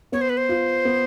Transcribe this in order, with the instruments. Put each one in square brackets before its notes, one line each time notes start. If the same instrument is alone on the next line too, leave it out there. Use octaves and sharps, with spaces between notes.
[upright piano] B3 [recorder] C#5
[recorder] C5
B4
C5
[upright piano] F4
B3